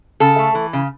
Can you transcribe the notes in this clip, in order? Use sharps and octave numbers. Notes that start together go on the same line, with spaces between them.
C#3 A4
A3
E3
C#3